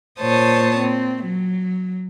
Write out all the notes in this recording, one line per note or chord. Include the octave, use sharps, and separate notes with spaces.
A#2 C5 C#5 A5 D#6
C4
F#3